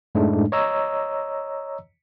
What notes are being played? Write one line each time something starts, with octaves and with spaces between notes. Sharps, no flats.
F#2 A2 G#3 A3 D4 D#4
C#5 D#5 A#5 E6